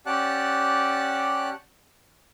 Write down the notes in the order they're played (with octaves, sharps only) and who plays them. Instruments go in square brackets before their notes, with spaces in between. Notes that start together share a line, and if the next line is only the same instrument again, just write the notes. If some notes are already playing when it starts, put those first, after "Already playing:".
[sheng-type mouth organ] C#4 G4 D5 F#5 A5 F#6